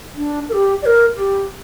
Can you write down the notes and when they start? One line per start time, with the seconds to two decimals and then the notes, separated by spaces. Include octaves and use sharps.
0.16 D4
0.49 A#4
0.53 G4
0.82 D5
0.86 A#4
1.16 G4